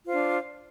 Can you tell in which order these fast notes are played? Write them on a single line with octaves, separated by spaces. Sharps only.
F4 C5 D4